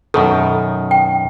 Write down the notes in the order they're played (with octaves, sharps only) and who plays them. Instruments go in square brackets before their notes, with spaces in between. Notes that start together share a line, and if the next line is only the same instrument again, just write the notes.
[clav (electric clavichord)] F#2 B2 D#3 [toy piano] A4
[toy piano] G5